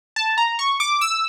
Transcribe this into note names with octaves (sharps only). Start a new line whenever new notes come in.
A5
A#5
C#6
D6
E6